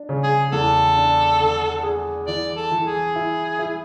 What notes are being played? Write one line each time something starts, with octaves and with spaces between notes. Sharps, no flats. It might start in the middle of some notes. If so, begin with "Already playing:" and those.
Already playing: D4
C#3
G#4
E2 A4
D4
D3
G#4
E3 D5
A4
E3
G#4
E4
E4